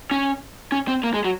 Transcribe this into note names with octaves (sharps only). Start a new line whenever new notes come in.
C#4
C#4
C4
A#3
G#3
F#3